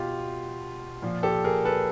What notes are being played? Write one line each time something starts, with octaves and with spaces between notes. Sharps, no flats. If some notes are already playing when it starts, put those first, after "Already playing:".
Already playing: B2 F4 G4
A#2 F3
G4 A4
G#4 A#4
A4 B4